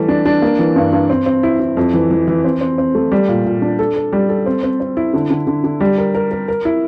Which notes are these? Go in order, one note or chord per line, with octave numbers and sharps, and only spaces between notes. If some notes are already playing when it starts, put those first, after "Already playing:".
Already playing: E3 G3 A3
D4
D4
A#3
E3
G2
G2
C4
C4
E4
E4
F2
E3
E3
E3
C4
C4
C4
A3
G3
A#2
A#2
D4
A4
A4
G3
A4
C4
C4
C4
E4
D3
D3
D3
D3
G3
A#4
A#4
A#4
A#4
E4